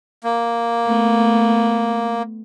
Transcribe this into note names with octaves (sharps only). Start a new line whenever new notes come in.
A#3
A3 B3